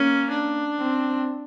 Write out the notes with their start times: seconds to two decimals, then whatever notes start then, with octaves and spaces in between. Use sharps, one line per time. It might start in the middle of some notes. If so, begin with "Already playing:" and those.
Already playing: A#3 C#4
0.30 D4
0.79 C4